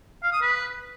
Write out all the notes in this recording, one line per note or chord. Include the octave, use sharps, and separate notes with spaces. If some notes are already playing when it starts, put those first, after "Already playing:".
F5
D#6
B4